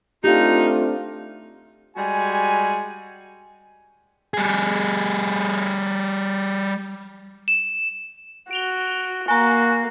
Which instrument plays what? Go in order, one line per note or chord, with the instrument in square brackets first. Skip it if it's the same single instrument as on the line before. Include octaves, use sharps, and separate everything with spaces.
[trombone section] A3 C4 D4 [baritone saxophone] D#4 [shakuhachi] F4 [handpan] G4
[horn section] G3 G#3 F#4 G#5
[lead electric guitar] G3 G#4
[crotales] E7
[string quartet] F#4 [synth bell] D7 F7 G7
[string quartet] A#3 [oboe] F#4 [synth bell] G#5 A#5